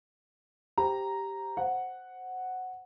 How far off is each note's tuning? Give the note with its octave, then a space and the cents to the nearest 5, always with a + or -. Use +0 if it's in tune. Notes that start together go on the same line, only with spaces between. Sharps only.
G4 +0 C5 +0 A#5 +0
C5 +0 F#5 +0